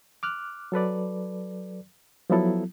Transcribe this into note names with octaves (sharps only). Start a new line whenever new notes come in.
D6 F6 F#6
F#3 A4 B4 D5
F3 F#3 B3 E4 A4